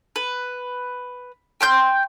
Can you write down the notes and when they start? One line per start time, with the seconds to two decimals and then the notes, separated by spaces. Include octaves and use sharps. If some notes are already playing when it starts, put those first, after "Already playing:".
0.16 B4
1.61 G5 C6 G6